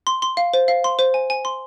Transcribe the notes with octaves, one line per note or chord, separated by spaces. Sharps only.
C6
C6
F5
C5
F5
C6
C5
G#5
G#5
C6